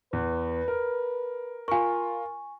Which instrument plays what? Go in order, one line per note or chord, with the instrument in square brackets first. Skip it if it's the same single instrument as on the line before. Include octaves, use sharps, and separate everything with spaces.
[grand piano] E2 [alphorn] B4
[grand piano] A#4
[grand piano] F4 A#4 [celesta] G#5 C#6